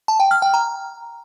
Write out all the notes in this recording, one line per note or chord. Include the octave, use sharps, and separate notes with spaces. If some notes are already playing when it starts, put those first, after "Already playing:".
A5
G5
F6
G5
A#5